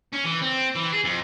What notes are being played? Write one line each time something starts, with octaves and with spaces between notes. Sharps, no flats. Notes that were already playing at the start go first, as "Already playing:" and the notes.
C#4
E3
C4
E3
G#4
F2